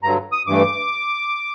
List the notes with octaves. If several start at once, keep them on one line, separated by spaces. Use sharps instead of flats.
G2 D3 F#3 A#5
D#6
G2 E3 A3 D6